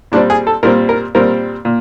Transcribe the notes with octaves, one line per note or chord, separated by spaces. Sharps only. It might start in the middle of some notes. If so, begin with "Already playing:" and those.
A#2 G3 C4 D4
G#4
A4
A#2 G3 C4 A#4
A#4
A#2 G3 C4 A#4
A#2